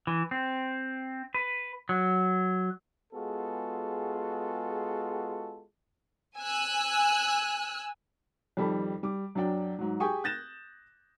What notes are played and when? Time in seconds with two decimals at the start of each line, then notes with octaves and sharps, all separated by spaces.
0.07 E3
0.31 C4
1.34 B4
1.89 F#3
3.13 G#3 B3 F4 F#4 G#4 A4
6.38 G#5 E6 F#6
8.57 F2 D#3 G3 A4 B5
9.03 G3 D6
9.35 F#2 F#3 D4 D5 G5
9.79 G#2 F#3
10.00 G4 G#4 G5 G#5 C#6 D#6
10.24 F#6 G6 A6 A#6 E7